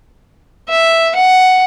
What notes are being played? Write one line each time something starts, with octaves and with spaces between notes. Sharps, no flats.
E5
F#5